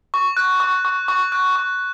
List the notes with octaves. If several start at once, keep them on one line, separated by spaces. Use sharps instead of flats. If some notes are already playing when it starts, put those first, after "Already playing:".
C#6
F#6
C#6
C#6
C#6
F#6
C#6